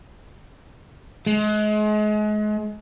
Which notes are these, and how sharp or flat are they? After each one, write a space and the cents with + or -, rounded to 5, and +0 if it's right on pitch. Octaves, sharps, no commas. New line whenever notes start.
G#3 +35